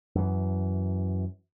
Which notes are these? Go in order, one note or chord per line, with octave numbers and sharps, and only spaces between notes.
F#2 E3